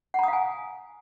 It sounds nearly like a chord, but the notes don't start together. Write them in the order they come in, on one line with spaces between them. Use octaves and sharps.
F#5 A#5 D#6 F5 G#5